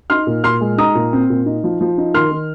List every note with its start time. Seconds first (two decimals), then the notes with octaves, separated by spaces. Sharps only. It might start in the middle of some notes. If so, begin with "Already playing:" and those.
0.10 D#4 C6 F6
0.27 A#2
0.44 A#2 C6 F6
0.61 G#3
0.78 D#4 A#5 D#6
0.95 A#2
1.13 C4
1.30 A#2
1.46 D#4
1.64 F3
1.81 F3
1.98 D#4
2.14 D#3 C6 F6
2.31 D#3